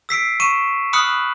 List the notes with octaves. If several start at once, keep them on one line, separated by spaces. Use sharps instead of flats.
E6 B6 C7 D7
C#6 D#7 E7
B5 D#6 F6 F#6 C#7 F#7